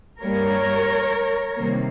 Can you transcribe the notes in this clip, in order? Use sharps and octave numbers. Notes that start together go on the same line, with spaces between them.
G2 G3 A#3 A#4 C#5
C3 D#3 G3 A#3